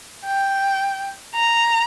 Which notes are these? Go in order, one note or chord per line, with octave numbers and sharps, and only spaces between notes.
G5
A#5